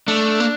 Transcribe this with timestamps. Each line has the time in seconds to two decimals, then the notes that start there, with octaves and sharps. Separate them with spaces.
0.08 A3 D4
0.40 A#3